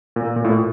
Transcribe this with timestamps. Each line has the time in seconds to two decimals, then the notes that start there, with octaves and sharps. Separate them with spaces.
0.16 A#2
0.36 A#2
0.45 A2